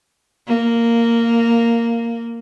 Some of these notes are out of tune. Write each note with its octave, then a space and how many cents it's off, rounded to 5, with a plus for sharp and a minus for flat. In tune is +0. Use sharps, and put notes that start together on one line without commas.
A#3 -5